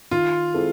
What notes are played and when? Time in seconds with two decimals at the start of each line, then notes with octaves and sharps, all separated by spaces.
0.11 D#3 F4
0.54 G#3 C4 E4 A4